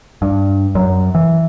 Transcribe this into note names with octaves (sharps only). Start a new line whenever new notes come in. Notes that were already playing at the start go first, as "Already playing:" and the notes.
G2
F#2
E3